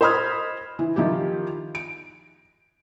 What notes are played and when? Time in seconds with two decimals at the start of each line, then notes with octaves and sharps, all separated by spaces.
0.01 C5 D#5 B5 D#6 F6 G#6
0.79 E3
0.96 D#3 F3 E4 G4
1.75 D7